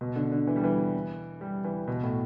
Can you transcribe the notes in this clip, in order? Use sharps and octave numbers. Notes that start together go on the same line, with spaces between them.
B2
D3
D3
E3
G3
E3
G3
E3
B2
A2